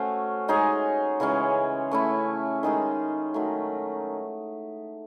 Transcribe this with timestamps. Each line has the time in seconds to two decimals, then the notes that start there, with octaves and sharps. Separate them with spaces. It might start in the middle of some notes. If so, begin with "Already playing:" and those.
Already playing: A3 C#4 F#4 C5
0.48 G#3 D#4 G#4 C#5
1.20 C#3 E3 G#3 C#4
1.91 A3 C#4 E4
2.63 D#3 G#3 D#4 G#4
3.34 D#3 F#3 A3